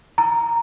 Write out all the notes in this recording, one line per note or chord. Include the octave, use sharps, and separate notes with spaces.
A#5